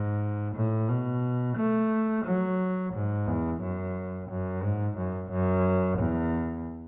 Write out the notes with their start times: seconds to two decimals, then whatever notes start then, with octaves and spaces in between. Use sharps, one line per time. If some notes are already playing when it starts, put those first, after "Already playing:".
Already playing: G#2
0.55 A2
0.89 B2
1.57 A3
2.25 F#3
2.93 G#2
3.27 E2
3.61 F#2
4.30 F#2
4.63 G#2
4.98 F#2
5.31 F#2
5.99 E2